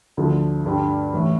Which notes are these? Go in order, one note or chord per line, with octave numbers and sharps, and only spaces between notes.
D2 D3 F3 A3
G2 D3 G3
A1 A2 E3